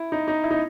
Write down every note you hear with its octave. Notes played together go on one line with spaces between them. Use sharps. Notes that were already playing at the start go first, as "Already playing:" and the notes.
Already playing: E4
D#4
D#4
E4
D#4